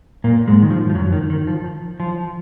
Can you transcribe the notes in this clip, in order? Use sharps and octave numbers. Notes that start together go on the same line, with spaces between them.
A#2 A#3
G#2 G#3
D#3
F3
F3
F#2 F#3
D#3
D#3
F3
F3